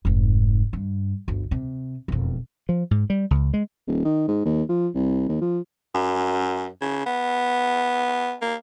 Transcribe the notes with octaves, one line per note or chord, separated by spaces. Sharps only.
F1 G#2
G2
G1 D2
C3
E1 F2
F3
G#2
G3
C#2
G#3
D#1
D#3
G#2
D#2
F3
C2
D#2
F3
F#2
C#3
B3
A#3